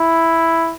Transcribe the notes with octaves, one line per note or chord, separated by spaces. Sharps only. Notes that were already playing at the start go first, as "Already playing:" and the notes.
Already playing: E4